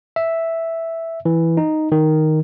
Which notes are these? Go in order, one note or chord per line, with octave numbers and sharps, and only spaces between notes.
E5
E3
D#4
D#3